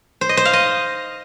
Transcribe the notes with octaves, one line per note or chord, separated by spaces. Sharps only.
C5
D#5
C5
F5
D#5